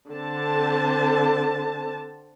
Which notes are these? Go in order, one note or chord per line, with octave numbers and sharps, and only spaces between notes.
D3 C4 A5